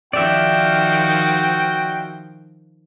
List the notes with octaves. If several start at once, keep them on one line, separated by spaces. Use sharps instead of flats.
D#3 F3 F#4 D5 E5 G5